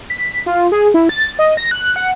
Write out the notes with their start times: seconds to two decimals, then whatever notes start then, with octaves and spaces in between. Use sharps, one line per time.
0.10 B6
0.46 F4
0.72 G#4
0.94 E4
1.09 A6
1.39 D#5
1.57 A#6
1.71 F#6
1.96 F#5